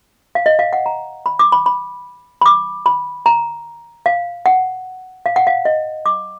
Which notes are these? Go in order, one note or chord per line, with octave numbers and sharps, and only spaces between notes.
F5
D#5
F5
F#5
A#5
B5
D6
B5
B5
B5
D6
B5
A#5
F5
F#5
F5
F#5
F5
D#5
D6